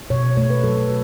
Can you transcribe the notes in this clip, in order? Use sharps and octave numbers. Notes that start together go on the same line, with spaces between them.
B2 C#5
A3 C#5
B4
F#3 A4
A4
B4